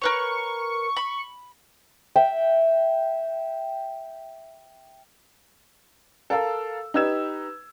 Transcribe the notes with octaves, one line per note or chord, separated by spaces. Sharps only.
A#4 B4 C#5 C#6
B5
E5 G5
A4 A#4 F5 E6
D#4 G4 B4 E6 G#6 E7